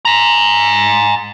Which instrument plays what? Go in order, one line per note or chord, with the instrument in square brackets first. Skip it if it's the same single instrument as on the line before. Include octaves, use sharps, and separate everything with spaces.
[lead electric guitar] G#5 A#5